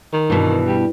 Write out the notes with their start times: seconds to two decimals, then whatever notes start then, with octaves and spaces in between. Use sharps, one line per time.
0.13 D#3
0.30 G2 B2 E3
0.67 G3